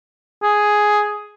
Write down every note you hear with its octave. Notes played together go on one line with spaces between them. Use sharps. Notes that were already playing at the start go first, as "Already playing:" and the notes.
G#4